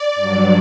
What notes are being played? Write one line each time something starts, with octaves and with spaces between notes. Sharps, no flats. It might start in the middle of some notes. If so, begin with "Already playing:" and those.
Already playing: D5
G2 F#3